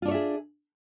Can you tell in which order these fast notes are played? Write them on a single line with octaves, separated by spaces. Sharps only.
F4 D4 C#5 E5 G#4